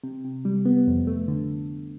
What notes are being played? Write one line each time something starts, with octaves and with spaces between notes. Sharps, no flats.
C3
C3
G3
B3
F2
A3
D3